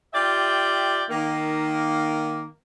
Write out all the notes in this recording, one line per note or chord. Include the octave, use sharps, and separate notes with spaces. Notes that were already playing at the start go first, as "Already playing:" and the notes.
F4 G4 D5 E5 G5
D#3 A#3